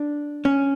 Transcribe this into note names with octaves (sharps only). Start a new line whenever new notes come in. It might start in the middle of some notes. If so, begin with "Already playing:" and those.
Already playing: D4
C#4